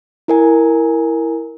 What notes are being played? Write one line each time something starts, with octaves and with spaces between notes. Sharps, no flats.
E4 A#4 G#5